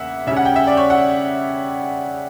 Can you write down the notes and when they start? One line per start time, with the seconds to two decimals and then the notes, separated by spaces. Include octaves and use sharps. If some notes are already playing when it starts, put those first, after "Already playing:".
Already playing: E2 C#3 A#3 E5 F#5
0.27 C#3 G3 C#4 E5
0.36 F#5
0.45 G5
0.56 E5
0.67 D5
0.77 C#5
0.90 F#5